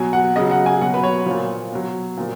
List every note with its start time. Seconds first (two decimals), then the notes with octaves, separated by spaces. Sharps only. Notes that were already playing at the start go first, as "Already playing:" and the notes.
Already playing: B2 F#3 G#5
0.13 F#5
0.36 C#3 F#3 D#5
0.51 F#5
0.66 G#5
0.81 B2 F#3 F#5
0.94 B4
1.04 C#5
1.26 A#2 F3 C#5
1.72 B2 F#3
2.17 A#2 F3